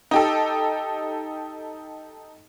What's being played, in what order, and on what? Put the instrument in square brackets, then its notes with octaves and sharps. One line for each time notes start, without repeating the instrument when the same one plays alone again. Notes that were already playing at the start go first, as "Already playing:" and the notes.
[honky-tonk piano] D#4 G4 A4